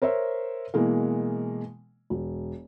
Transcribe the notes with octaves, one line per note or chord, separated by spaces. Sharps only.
A#4 C5 C#5 E5
B2 E3 G#3 A#3
E1